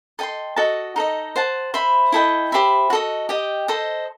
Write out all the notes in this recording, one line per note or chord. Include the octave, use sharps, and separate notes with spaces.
A4 D#5 G5 C6
F#4 A4 D#5 A5
D#4 A4 D#5
C5 F#5 A5
C5 E5 B5
E4 A4 D#5 G5
G4 C5 E5 B5
F#4 A4 D#5
G4 D#5 G5
A4 C5 D#5